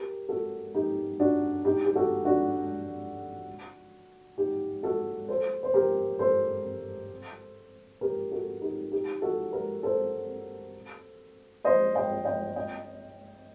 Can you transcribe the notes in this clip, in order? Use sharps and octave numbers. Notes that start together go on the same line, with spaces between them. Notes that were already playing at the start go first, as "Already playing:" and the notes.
Already playing: G4 A#4
F#4 A4
D#4 G4
D4 F#4
D#4 G4
G4
F#4 A4
D4 F#4
D#4 G4
F#4 A4
A4 C5
C5
G4 A#4
A4 C5
G4 A#4
F#4 A4
D#4 G4
D#4 G4
F#4 A4
G4 A#4
A4 C5
C5 D#5
D#5 G5
D#5 G5
D#5 G5